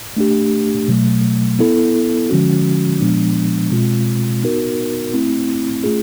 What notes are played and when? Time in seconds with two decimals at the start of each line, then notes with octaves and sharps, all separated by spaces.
0.17 A3 D4 G4
0.88 B2 F#3 A3
1.59 B3 E4 A4
2.30 D3 F3 G#3 C#4 F#4
3.01 A#2 F3 G#3 B3 D4
3.71 B2 G#3 C4 F4
4.42 B3 D#4 F#4 A#4
5.14 A3 C4 E4
5.84 A3 C#4 F4 G#4